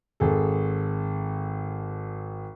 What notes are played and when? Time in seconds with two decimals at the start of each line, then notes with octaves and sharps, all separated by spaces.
0.20 G#1 G#4 A4